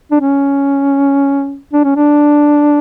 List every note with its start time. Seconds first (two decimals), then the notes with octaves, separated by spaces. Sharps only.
0.12 D4
0.20 C#4
1.73 D4
1.84 C#4
1.96 D4